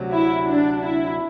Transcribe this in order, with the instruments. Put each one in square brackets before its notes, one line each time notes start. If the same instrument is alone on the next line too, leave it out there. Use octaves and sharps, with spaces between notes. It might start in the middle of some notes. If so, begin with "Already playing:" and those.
Already playing: [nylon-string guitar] D2 C3 F#3
[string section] E4
D4
E4